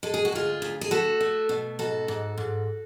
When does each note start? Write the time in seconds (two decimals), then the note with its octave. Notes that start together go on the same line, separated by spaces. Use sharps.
0.03 G#3 A4
0.14 G#4
0.25 F#4
0.32 D2 F4 G#4
0.62 D2
0.81 G#4
0.91 A3 F#4 A4
1.21 A3
1.49 B2
1.79 G#2 F#4 A4
2.08 G#2
2.38 G#2